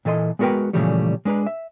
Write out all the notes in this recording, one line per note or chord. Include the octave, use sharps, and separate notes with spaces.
A#2 E3 A4 D#5 C6
G#3 B3 F#4 A#4 B4 G5
A#2 C#3 E3 F3 G3 A3
G#3 D4 B4 A#5
E5